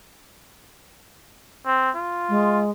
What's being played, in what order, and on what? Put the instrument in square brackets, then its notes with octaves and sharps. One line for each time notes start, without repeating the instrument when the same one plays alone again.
[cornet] C4
F4
[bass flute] G#3